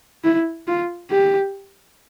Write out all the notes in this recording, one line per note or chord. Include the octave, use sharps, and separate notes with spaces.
E4
F4
G4